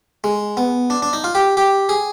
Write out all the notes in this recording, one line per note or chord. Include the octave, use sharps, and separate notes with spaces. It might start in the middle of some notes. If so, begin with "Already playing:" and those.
G#3
B3
D4
D4
D#4
F4
G4
G4
G#4